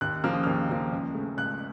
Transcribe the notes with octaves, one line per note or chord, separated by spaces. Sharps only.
D#2 F#6
C#3 F3 A#3 F6
D#6
D#2 F6
C#3 F3 A#3
C#2
C#3 A3
C#2 F#6